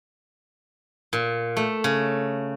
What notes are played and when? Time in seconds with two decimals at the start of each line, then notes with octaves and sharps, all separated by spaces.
1.13 A#2
1.57 A3
1.84 C#3